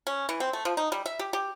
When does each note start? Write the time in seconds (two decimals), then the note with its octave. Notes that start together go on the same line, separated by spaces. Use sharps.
0.07 C#4
0.29 E3
0.40 C4
0.53 A3
0.65 F3
0.77 D#4
0.92 G3
1.06 E5
1.19 G4
1.33 G4